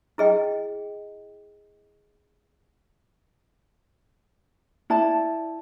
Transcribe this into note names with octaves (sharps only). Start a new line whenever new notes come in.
E4 G#4 D#5 G5
E4 D5 A5